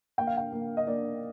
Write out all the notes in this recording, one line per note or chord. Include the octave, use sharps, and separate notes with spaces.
A#3 G5
F5
G5
A#3
D#5
A#3 D5